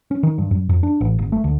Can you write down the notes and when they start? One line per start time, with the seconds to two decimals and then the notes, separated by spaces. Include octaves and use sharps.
0.11 C#4
0.23 D#3
0.38 G2
0.51 F#2
0.69 F2
0.83 D4
1.01 A1
1.19 G1
1.32 A3
1.44 D2